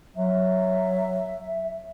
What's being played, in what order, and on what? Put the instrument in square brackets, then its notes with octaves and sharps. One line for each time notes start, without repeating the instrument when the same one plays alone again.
[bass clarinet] F#3 [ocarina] E5